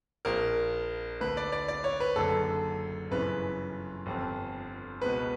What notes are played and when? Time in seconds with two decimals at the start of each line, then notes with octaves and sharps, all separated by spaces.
0.25 A#1 A#2 A#4
1.20 D2 D3 B4
1.37 D5
1.52 D5
1.68 D5
1.84 C#5
2.00 B4
2.16 F#1 F#2 D3 A4
3.11 G1 F#2 C#3 E3 B4
4.06 G1 F2 D3
5.01 C#2 B2 B4